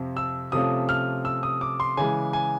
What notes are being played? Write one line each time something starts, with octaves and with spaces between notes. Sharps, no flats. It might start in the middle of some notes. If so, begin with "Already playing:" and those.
Already playing: F2 C3 F3
E6
C3 F3 A3 C#4 F4 D#6
F6
E6
D#6
D6
C6
C#3 E3 G#3 G#5
G#5